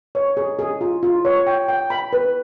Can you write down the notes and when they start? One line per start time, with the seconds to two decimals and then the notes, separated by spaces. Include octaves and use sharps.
0.15 C#5
0.37 G#4
0.59 G#4
0.81 F4
1.03 F4
1.25 C#5
1.47 G5
1.68 G5
1.90 B5
2.13 B4